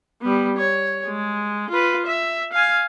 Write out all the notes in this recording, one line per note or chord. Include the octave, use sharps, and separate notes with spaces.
G3 B3
C#5
G#3
F4 B4
E5
F5 G#5